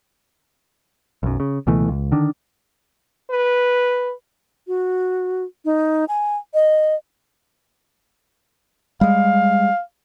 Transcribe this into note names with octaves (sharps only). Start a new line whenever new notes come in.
B1 F#2
C#3
C#2 B2 E3 A3
C#2
D3 D#3 D4
B4
F#4
D#4
G#5
D#5
G3 G#3 F5